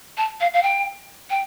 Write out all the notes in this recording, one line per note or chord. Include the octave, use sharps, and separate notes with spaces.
A5
F5
F5
G5
G5